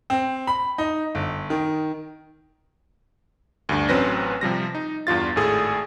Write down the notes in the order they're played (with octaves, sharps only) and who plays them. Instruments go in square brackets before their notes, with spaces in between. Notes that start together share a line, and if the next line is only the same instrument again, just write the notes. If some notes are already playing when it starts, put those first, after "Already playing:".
[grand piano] C4
B5
D#4
G1
D#3
[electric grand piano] D2 G2 D4
A1 F#3 C4 C#4 B4 A#6
C3 F3 G3 A#6
D#4
E2 G2 F4 A6
G#1 A2 G#4 A4